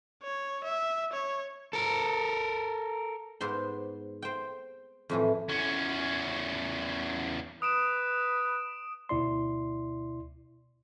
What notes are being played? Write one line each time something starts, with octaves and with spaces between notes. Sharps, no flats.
C#5
E5
C#5
A4 A#4
G#2 B3 C5 C6
C5 G5
F2 A2 E3
E2 C#4
B4 D#6 D7 E7
D2 B2 E4 D5 C6